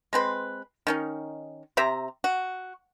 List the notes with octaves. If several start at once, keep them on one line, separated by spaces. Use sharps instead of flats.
G#3 C4 B4
D#3 C#4 D#4
C3 G4 E5 A#5
F#4